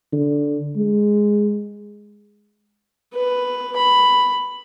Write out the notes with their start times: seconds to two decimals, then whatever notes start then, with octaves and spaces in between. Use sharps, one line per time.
0.13 D3
0.77 G#3
3.14 B4
3.76 B5